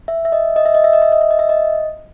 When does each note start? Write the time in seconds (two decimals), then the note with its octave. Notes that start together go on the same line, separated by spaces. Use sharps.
0.08 E5
0.25 E5
0.32 D#5
0.56 D#5
0.65 E5
0.75 D#5
0.84 E5
0.93 D#5
1.02 E5
1.12 D#5
1.21 E5
1.31 D#5
1.39 E5
1.49 D#5